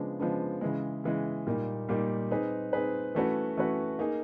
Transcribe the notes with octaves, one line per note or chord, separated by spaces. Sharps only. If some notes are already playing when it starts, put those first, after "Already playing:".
Already playing: C#3 F3 G#3 B3 D4
C#3 F3 G#3 B3 D4
C#3 E3 G#3
C#3 E3 G#3
A#2 G3 A#3 D#4
A#2 G3 A#3 D#4
C4 D#4 G#4 B4
C4 D#4 G#4 B4
E3 A3 C#4 F#4 B4
E3 A3 C#4 F#4 B4
A#3 D#4 G#4